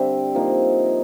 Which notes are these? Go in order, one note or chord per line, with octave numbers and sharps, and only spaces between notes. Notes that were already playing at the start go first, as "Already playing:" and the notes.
Already playing: D3 G3 C4 E5
F3 A#3 D#4